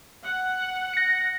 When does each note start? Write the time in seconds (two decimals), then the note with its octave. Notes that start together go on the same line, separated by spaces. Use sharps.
0.23 F#5
0.94 A#6 C#7